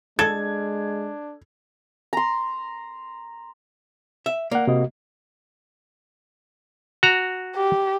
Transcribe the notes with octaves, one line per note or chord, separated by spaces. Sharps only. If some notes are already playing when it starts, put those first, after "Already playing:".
G#3 D4 A4 G#6
A#5 C6
E5
A#3 D5 F#5
C3 F#4 D#5
F#4 A#5
G4